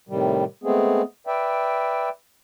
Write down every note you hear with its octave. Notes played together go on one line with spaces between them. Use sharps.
A2 C3 D#3 G3
G#3 A3 B3 C4 G#4
B4 D5 E5 G5